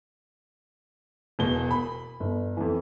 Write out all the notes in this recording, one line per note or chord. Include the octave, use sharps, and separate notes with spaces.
E1 B2 G7
B5
G1
F2 E3